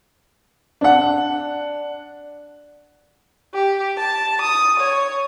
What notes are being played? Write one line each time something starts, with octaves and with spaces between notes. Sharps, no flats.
D4 F#5
G4
A5
D#6
C#5